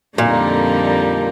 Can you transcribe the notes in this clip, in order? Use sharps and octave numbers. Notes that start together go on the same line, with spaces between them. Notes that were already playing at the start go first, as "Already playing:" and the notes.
F2 A#2 D3 G3 A#3 D#4